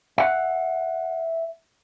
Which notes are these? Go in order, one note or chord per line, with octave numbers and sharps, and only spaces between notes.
E5 F#5